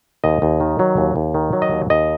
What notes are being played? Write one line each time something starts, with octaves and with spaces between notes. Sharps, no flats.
D#2 D#5
D#2
D#3
F#3
D#2
D#2
D#3
F#3
D#5
D#2
D#2 D#5